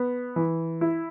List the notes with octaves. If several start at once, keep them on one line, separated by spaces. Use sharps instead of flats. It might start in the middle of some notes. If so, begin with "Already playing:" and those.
Already playing: B3
E3
E4